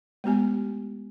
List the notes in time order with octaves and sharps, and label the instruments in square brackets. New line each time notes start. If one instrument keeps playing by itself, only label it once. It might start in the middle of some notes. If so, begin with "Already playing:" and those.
[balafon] G#3 A3 B3 G4 G#5